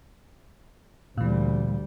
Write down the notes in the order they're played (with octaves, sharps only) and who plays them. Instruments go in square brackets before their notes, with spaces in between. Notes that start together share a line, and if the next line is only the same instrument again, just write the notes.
[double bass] D2 G3 [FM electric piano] A#2 E3